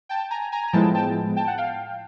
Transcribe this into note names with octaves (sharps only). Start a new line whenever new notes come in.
G5 A5
G#5 A#5
G#5 A#5
A#5
A2 F3 G#3 B3 E4 G5 A5
G5 A5
G5 A5
F#5
F5 G5